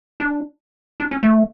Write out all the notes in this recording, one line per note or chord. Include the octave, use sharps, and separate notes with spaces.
D4
D4
C#4
A3